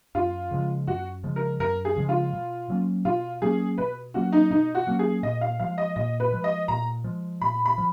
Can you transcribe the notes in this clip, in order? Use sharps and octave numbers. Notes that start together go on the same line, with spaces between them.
F#2 F4
C#3 F3 G#3
F#2 F#4
C#3 F3 G#3
A#4
F#2 A#4
G#4
C#3 F3 G#3
F4
B2
F#3 A#3 C#4
B2 F4
F#3 A#3 C#4 G#4
B2 B4
F#3 A#3 C#4 F#4
D#4
B2 D#4
F#4
F#3 A#3 C#4
G#4
A#2 D#5
F5
F3 G#3 F5
D#5
A#2 D#5
B4
F3 G#3
D#5
A#2 A#5
F3 G#3
A#2 B5
B5
F3